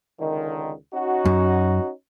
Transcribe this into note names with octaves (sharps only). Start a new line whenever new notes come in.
C#2 D3 D#3
C#4 D#4 F#4
F#2